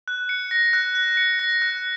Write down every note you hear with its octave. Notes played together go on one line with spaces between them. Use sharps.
F#6
C#7
A#6
F#6
F#6
C#7
A#6
F#6